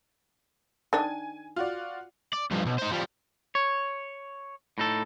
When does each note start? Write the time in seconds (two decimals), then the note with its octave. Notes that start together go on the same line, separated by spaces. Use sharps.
0.93 D#3 D4 G#5
1.56 F4 F#4 D5
2.33 D5
2.51 G2 F3
2.66 B1
2.78 D#4 C5
2.92 F3 G3
3.55 C#5
4.78 A2 D#4 A4